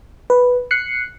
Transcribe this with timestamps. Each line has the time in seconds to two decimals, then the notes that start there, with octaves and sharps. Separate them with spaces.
0.30 B4
0.71 F#6 C7 C#7